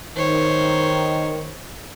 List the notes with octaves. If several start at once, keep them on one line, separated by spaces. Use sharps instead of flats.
D#3 C5 C#5